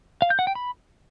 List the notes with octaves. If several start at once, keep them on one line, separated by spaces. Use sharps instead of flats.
F5
G6
F#5
G5
B5